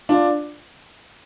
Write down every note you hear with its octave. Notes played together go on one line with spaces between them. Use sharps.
D4 F4